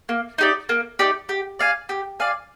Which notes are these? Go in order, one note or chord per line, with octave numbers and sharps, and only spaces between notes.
A#3
D#4 G4 D5
A#3
D#4 G4 D5
G4
D5 F5 G#5
G4
D5 F5 G#5